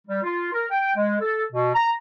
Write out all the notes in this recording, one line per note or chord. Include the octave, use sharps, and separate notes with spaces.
G3
F4
A#4
G5
G#3
A4
B2
A#5